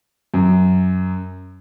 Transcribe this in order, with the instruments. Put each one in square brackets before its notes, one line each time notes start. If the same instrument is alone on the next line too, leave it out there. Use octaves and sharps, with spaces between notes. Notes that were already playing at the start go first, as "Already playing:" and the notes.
[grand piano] F#2